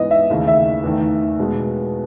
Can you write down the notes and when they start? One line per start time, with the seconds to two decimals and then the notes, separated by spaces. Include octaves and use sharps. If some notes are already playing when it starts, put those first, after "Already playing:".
Already playing: G#2 E3 B3 D#5
0.11 E5
0.30 D#2 C#3 E3 A3
0.48 E5
0.83 E2 D#3 A3
1.39 B2 G#3 B3